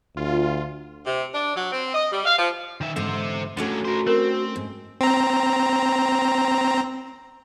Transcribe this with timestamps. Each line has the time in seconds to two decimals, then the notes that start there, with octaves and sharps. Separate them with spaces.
0.17 D2 F4
1.06 C3
1.34 D4
1.56 F#3
1.72 C4
1.94 D#5
2.12 G3
2.26 F5
2.39 F3
2.81 D#3 E5
2.96 E2 G#2 D3 C5 E5
3.57 D3 F#3 A3 C#4 D4
3.85 F#4 A#4 C5
4.07 C4 A#4
4.56 G#2
5.01 C4 A#5